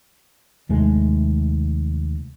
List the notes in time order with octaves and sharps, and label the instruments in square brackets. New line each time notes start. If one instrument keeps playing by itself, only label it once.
[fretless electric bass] D#2 C3 G#3 A3